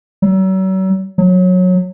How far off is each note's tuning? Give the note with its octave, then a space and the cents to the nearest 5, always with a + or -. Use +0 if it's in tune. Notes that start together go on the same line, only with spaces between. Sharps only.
F#3 +40
F#3 -20